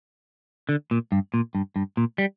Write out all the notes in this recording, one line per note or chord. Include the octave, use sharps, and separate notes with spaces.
D3
A#2
G2
A#2
G2
G2
A#2
G3